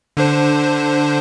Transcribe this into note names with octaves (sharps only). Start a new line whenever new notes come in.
D3 D4 C5